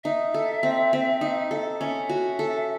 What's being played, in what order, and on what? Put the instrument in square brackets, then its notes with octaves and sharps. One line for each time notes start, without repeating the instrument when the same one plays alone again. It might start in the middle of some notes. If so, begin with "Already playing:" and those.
[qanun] D#4 [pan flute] E5
[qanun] A4
C4
C4
D#4
A4
[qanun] C#4 [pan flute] E5
[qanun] F#4
A4